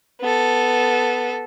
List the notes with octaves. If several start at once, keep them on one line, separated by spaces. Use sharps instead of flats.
B3 A4